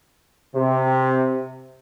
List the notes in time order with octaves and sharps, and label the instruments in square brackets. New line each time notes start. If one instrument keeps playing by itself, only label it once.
[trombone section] C3